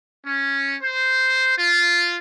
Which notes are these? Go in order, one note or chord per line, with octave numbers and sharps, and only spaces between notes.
C#4
C5
F4